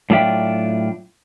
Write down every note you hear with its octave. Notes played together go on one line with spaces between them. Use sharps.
A2 F#3 D4 F4 E5 G5